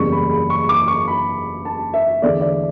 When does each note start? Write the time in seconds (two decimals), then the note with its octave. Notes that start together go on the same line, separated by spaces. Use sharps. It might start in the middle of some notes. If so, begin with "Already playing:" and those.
Already playing: F#1 E2 C#3 G3 C#6
0.12 B5
0.31 B5
0.50 C#6
0.69 D6
0.88 C#6
1.08 B5
1.65 A5
1.94 E5
2.22 E2 D3 A3 D5
2.41 D5